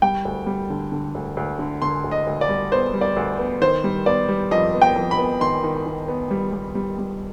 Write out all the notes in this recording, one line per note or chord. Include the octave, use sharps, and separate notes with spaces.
G3 G5
D2
G3
D3
D3
D2
D2
D3
D3 C6
D2
D#5
D2
D5
G3
B3 C5
G3
D5
D2
B3
D#3 C5
G3
B3 D5
G3
F2 D#5
B3
G5
F2
B5
B3
D#3 C6
D#3
D#3
B3
G3
G3
G3
G3